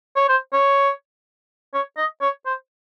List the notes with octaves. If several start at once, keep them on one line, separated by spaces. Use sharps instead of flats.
C#5
C5
C#5
C#5
D#5
C#5
C5